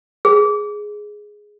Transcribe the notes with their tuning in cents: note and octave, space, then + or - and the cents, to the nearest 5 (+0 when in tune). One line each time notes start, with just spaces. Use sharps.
G#4 +5